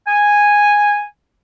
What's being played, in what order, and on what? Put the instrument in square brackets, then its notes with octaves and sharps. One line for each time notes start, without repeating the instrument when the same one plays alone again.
[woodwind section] G#5